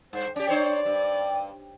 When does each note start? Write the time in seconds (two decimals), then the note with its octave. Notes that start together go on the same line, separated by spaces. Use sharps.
0.13 G2 C5
0.36 C#4 G4 D5
0.49 D4 C5 C#5
0.85 G2